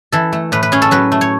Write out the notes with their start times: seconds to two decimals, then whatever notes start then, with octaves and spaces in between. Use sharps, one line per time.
0.12 E3 A4
0.33 A3
0.52 A2 B4
0.63 B4
0.72 C#4 G#4
0.82 A4
0.91 F#3 B4
1.12 A3
1.21 C#5